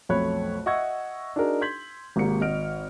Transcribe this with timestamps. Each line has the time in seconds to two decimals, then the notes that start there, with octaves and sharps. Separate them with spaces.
0.09 B1 F2 A3 C#5 B5 F#6
0.66 D#5 E5 F#5 C#6 E6 G#6
1.36 D4 D#4 F#4 G#4 A#4
1.61 C6 G6 G#6 B6 F#7
2.16 G#1 G#2 C3 A#3 C#7
2.41 G#1 D#5 F6 D7